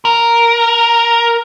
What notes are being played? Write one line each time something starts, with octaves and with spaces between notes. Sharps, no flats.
A#4